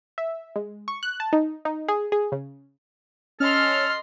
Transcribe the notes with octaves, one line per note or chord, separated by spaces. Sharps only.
E5
G#3
C#6
F#6
A5
D#4
D#4
G#4
G#4
C#3
C#4 A4 D#5 C6 F6